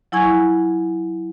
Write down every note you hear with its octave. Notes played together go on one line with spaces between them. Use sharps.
F#3 E4 G#5 C#6 G#6